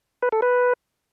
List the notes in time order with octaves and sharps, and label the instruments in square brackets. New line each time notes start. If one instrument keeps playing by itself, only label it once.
[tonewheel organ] B4
A4
B4